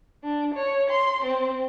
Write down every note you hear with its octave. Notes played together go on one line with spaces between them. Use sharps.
D4
C#5
C6
C4